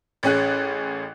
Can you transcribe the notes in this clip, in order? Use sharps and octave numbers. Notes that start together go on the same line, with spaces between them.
A1 C#4 G#4 F#6